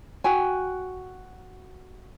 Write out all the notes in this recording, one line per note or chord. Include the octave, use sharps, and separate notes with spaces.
F#4 G5 G#5